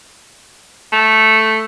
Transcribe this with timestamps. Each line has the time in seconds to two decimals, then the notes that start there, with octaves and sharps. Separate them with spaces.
0.92 A3